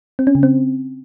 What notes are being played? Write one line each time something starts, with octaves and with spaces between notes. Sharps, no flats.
C4
C#4
C#3
C4